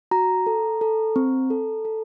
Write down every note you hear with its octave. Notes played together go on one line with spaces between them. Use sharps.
F#4 A#5
A4
A4
C4
A4
A4